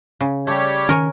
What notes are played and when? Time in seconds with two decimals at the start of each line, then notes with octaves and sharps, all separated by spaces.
0.20 C#3
0.47 G3 A3 G4 C#5
0.89 D#3 C#4 A#4 C#5 G#5